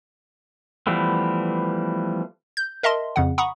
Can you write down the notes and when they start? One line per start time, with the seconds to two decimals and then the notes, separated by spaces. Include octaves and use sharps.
0.87 E3 F3 G3 A3 B3
2.57 G6
2.83 A#4 D#5 E5 A5 C6
3.16 F2 C#3 F#5
3.38 F#5 A#5 B5 C#6 D#6